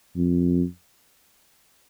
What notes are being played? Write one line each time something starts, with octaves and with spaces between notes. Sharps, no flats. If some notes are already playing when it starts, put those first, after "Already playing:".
F2